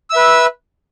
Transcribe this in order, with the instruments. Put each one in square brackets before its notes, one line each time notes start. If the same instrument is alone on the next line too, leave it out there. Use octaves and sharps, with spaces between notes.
[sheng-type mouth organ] E6
E5
B4